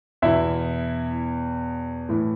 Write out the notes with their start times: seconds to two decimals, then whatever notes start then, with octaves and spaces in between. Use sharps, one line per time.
0.22 E2 B2 E4 E5
2.09 A2 E3